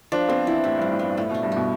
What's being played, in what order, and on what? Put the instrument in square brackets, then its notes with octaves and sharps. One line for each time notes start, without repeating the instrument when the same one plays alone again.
[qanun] F3 [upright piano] D4
[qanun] B3 [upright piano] C4
[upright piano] E3 [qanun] E4
[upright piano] A2 [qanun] G4
[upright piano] G2
[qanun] F3
[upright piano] A2
[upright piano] G2 [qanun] B3
[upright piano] A2 [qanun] A3
[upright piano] B2
[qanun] D4
[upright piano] G2
[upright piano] B2 [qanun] G4